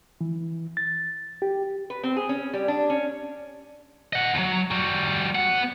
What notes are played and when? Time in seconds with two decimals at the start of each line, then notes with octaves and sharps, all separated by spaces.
0.21 E3
0.77 A6
1.42 G4
1.90 B4
2.03 C4
2.16 G#4
2.29 C#4
2.53 G3
2.68 D4
2.90 C#4
4.13 D#5 F#5
4.35 D#2 F#3
4.71 G3 F#4
5.35 B3 F#5